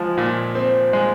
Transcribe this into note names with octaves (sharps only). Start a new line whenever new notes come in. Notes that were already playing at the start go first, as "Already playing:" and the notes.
Already playing: F3 G#3
A#2
C4
G#3